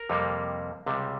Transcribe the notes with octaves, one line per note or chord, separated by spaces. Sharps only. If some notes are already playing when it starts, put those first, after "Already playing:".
Already playing: A#4
F2 C3 G3 A#3
C#2 C3 G3